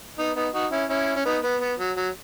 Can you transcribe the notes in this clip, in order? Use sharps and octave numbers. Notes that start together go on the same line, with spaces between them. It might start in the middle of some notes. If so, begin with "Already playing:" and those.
B3 D#4
B3 D#4
D#4 F#4
C#4 E4
C#4 E4
C#4
B3 D#4
B3
B3
F#3
F#3